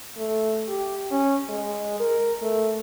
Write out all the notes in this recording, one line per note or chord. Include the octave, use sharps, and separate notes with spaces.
A3
G4
C#4
G#3
A#4
A3